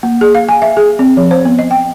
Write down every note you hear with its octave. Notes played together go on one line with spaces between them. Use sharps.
A#3
G#4
F5
G#5
E5
G#4
C4
F3
C5
B3
D#5
G5